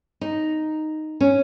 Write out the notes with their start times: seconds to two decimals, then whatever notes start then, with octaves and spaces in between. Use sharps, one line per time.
0.21 D#4
1.21 C#4